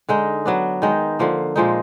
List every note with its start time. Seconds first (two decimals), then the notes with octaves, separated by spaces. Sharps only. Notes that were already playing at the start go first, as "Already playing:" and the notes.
0.09 D3 G#3 D#4
0.45 F#3 B3 D4
0.82 D#3 G#3 D#4
1.19 D3 F3 A#3
1.56 A#2 F3 G#3 D#4